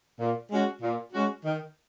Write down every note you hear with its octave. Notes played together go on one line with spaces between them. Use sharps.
A#2
G#3 C#4 F#4
A#2
G#3 C#4 F#4
D#3